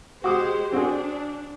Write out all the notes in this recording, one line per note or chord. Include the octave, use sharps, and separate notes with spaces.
G#3 F#4 G4 C5 D6 D#6
C4 D4 F#4 G#4